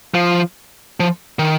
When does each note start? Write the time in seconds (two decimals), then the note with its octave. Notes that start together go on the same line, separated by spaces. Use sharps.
0.14 F3
1.00 F3
1.39 D#3